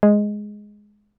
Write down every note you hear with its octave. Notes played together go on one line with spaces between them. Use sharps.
G#3